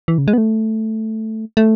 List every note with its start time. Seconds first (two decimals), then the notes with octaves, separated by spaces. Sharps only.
0.08 E3
0.18 C#3
0.28 G#3
0.33 B3
0.38 A3
1.57 A3